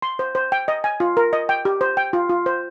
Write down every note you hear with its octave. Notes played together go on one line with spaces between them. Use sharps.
C6
C5
C5
G5
D#5
G#5
F4
A#4
D#5
G5
G4
C5
G5
F4
F4
C5